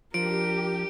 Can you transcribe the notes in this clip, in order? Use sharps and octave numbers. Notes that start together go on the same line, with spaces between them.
F3 D4 G4 A#4 D7